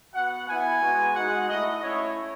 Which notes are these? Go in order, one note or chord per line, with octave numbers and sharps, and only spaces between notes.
B3 F#4 F#5
B3 E4 G#5
G#3 B3 F#4
G#3 D#4 F#4 F#5
A3 E4 D#5
A3 C#4 E4 C#5